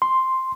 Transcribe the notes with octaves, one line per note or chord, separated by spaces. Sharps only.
C6